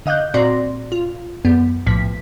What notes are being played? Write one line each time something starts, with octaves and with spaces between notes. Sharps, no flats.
D3 D#5 F5 F#6 G6
A#2 C4 F#4 D5 C6 A#6
F4
F#2 B3
B1 A2 F3 B6